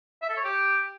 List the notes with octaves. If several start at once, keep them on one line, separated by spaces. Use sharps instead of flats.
E5
A4
C#5
G4